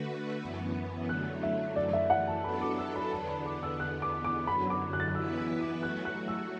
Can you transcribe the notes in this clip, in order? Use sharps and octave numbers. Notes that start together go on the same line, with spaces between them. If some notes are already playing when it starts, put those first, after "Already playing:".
Already playing: D3 A3 F#4 B4
F#2 E3 B3
D3 F#3 A3 F#6
E5
F#2 E3 A3 D5
E5
F#5
A5
F#3 B3 D4 A4 B5
D6
E6
B5
E2 D3 B3 D4 A5
B5
D6
E6
E2 D3 B3 F#6
D6
D6
F#2 D3 F#3 B5
D6
F#6
A6
F#6
E3 B3 E4 B4 E6
E6
D6
F#3 A3 F#4 F#6
F#6
E6